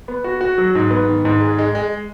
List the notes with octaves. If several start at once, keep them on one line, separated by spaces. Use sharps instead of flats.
B3
F#4
F#4
F#3
G#2
B3
D#3
G#2
G#3
G#3
G#3